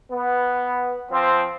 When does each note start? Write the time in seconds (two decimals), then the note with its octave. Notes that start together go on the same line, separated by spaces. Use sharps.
0.11 B3
1.11 F3 C4